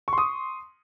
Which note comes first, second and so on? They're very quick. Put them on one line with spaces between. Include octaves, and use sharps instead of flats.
C#6 C6 D#6